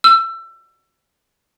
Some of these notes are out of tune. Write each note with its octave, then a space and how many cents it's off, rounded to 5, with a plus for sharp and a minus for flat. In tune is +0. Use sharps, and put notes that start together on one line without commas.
E6 +25